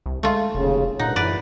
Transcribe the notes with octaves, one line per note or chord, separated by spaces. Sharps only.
C2
G#3 A3 F4
F1 D#2 C#3
G2 A#2 D#4 F#5
F#2 E3 B4 D5